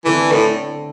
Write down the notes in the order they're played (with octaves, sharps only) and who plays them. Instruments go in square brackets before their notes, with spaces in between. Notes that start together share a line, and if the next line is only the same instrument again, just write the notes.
[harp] D3 A3 C4 [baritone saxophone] E3
[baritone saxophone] A2